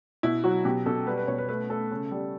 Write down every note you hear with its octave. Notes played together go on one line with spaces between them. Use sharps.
B2 E4
F#3 F#4
B2 G4
B2 A4
G3 B4
B4
B2 C#5
B4
A3 B4
A3 A4
C#3
G3